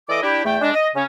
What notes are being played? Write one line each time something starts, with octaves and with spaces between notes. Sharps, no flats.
E3 A3 A4 D5 D#5 D6
D4 E4 G4
E2 A3 G5
G#3 D4
D#5
C#3 C#4